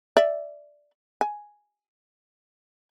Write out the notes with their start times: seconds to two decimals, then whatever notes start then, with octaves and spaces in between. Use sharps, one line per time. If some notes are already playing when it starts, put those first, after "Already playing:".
0.17 D5 E5
1.21 G#5